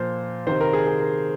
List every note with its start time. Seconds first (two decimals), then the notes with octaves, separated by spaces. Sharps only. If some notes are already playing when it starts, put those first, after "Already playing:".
Already playing: A#2 F3 C5
0.47 C3 D#3 C5
0.60 A#4
0.73 G#4
0.87 G#4
1.00 A#4